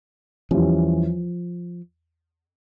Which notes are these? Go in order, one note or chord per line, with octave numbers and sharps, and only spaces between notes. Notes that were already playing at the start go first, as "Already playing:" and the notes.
E2 E3 F3 G3 C#4